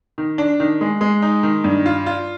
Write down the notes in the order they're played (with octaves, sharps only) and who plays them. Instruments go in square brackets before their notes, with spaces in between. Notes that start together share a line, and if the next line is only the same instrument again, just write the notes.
[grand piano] D#3
D4
D#3
G#3
G#3
D#4
D#3
G2
F4
F4